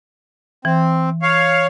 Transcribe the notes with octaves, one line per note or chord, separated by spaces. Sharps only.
E3 C4
C#5 F5